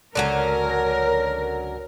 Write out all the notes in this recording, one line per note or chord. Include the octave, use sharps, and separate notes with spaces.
C#2 D3 F#3 C#4 A#4 D5